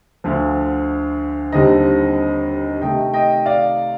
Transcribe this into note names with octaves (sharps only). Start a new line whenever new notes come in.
D2 D3 F3
D#2 D3 G3 C4 D#4 D#5
C3 D#3 A3 D#4 D#5 G5
D#5 G5
D5 F5